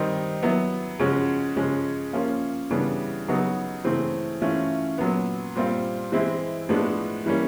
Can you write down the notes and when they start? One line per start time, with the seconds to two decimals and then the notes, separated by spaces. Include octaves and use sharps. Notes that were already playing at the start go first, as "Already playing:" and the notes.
Already playing: D#3 G3 C4 D#4
0.43 F#3 B3 E4
0.99 C#3 F3 G#3 C#4 F#4
1.56 C#3 F3 G#3 C#4
2.13 F3 A#3 C#4 F4
2.70 C#3 E3 G3 B3 D4
3.28 C#3 F#3 B3 D#4 F#4
3.85 C#3 E3 A3 C4
4.42 E3 A3 C#4 F4
4.98 A#2 F#3 B3
5.56 A#2 G3 C4 F4
6.12 E3 G#3 C4 E4
6.69 A2 F3 G#3 B3 D4
7.26 E3 G3 A#3 C#4